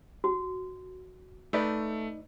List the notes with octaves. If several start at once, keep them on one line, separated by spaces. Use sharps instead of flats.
F#4
A3 D#4 B4 D5